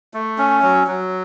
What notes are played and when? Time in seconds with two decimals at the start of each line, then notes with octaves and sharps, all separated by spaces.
0.14 A3
0.38 C#4
0.63 F#3
0.87 F#3